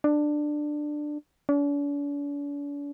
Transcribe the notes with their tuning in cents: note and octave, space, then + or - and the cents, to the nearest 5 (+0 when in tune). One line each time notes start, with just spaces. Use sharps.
D4 +15
D4 -45